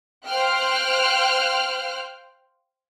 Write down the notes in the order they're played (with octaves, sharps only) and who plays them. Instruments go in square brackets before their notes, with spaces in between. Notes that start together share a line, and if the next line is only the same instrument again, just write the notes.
[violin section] C5 F5 G5 F6 F#6